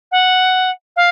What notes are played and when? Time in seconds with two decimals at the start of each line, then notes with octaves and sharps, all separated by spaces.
0.12 F#5
0.96 F5